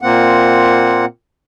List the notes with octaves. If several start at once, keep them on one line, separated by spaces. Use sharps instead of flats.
A#2 A#3 C4 F#5